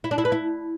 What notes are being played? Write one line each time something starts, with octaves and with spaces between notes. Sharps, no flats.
E4
D4
E4
B4
E4